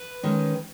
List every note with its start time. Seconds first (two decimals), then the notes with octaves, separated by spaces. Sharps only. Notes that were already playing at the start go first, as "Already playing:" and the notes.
Already playing: B4
0.23 D#3 G#3 C#4